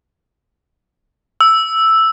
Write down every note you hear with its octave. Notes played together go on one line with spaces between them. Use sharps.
E6